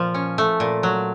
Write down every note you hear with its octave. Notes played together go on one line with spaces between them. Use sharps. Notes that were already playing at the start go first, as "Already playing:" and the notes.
Already playing: A#2 F3
C#4
A3
A#2
F#3